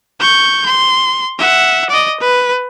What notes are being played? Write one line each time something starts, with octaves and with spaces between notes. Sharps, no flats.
C#6 G6
C6
E5 F#5
D5 D#5
B4